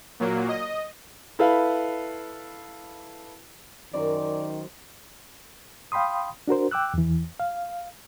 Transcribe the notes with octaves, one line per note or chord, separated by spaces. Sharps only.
A#2 F#3 A#3
D#5
E4 A4 B4 F5
F#2 D#3 C5 D5
F5 G5 B5 C6 D#6
D4 F#4 A#4 C5
G5 D6 E6 F#6
E2 E3
F5